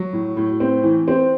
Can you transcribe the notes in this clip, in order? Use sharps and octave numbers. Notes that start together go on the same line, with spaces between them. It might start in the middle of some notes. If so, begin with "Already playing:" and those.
Already playing: F#3
A2
A2
C4
E3
C4